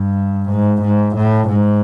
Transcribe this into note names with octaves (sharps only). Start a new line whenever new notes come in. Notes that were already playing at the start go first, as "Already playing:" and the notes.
Already playing: G2
G#2
G#2
A2
G#2